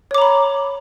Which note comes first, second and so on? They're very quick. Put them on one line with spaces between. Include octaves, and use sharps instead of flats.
C#5 D6 A#5 B5